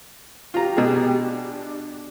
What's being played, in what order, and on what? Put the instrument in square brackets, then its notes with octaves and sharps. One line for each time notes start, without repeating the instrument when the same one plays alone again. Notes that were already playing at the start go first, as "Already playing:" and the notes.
[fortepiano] F4 A#5 [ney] G4
[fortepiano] B2 G#4
[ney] D4